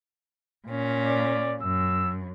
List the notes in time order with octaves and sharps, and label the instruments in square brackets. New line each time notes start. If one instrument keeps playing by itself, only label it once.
[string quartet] A#2 C#4
[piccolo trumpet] D5
[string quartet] F#2 [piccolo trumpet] E6